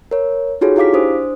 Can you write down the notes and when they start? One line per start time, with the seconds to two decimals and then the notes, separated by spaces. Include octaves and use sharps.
0.11 A#4 C#5
0.61 D#4 F4 F#4 G#4 A4 C#5
0.76 E4 G4 F5 D6 B6
0.93 D4 C5 D#6